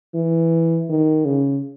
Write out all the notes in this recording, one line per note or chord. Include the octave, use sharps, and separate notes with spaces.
E3
D#3
C#3